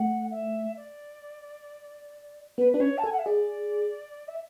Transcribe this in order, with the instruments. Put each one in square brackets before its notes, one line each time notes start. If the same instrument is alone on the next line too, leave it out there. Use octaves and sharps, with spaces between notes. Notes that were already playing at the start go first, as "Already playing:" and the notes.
Already playing: [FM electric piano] A3 [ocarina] F#5
[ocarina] E5
D5
[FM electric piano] B3 [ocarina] B4
[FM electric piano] D4 [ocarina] B4
[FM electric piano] C#4 [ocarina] C#5
[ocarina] A5
[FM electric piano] A4 [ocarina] G#5
[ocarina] F#5
E5
[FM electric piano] G#4 [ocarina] D5
[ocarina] E5